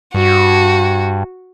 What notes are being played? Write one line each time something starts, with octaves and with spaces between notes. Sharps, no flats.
G2 F#4